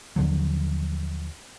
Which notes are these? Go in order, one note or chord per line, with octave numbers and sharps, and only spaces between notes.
D#2 D3 F3 F#3